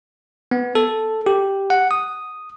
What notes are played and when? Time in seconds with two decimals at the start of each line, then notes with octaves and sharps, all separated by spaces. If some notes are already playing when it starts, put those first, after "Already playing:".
0.51 B3
0.75 A4
1.26 G4
1.70 F#5
1.91 D#6